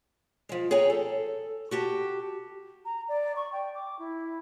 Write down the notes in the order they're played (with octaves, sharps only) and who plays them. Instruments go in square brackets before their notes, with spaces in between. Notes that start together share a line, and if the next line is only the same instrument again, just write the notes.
[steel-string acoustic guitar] F3 G#3
G#4 C#5 G5 G#5 A#5
A4
F#4 G4 A5
[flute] A#5
D5
C#6
G5
D6
E4